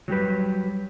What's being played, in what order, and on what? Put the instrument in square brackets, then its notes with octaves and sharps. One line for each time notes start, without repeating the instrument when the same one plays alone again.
[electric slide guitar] F#3 G3 G4 B4